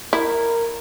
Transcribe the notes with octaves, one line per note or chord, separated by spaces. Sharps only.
E4 A#4